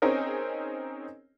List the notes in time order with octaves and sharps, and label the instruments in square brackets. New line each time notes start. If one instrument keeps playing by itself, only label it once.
[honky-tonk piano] C4 C#4 D#4 G#4 A#4